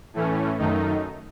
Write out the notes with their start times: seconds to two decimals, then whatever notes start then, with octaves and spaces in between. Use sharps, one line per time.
0.14 A2 E3 A3 C#4
0.58 F#2 D#3 A3 D#4